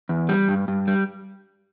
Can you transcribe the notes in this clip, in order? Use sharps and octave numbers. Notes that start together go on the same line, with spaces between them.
E2
G3
G2
G2
G3